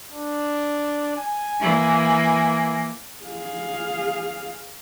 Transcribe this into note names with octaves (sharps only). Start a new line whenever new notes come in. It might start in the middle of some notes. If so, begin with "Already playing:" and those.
D4
G#5
E3 A#3
G#4 F5